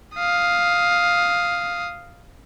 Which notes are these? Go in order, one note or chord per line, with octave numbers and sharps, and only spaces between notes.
F5 D#6